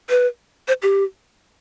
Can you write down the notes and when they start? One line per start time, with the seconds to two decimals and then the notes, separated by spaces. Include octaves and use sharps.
0.10 B4
0.68 C5
0.82 G4